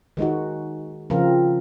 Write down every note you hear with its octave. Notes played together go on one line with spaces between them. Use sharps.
D#3 G#3 D#4 F#4
C#3 F3 C4 F4 A#4